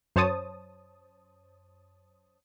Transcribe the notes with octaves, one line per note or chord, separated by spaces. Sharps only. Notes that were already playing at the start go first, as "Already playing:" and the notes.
F#2 C5 C#5 A5 D#6